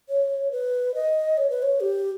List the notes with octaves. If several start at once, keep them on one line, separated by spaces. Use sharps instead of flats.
C#5
B4
D#5
C#5
B4
C#5
G4